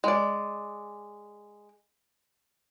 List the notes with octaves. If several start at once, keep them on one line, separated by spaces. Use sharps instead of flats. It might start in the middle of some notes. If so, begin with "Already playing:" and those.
G#3 D5